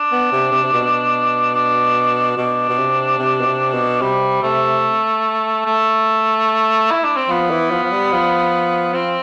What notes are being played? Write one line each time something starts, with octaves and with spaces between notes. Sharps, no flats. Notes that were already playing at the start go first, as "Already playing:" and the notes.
Already playing: D4
B3
C3
C3
C3
B2
D4
B2 D4
B2
C3
C3
B2
C3
B2
C3 G3
C3 A3
A3
E4
D4
C4
F3 B3
E3
F3
F3
G3
F3
F3 C4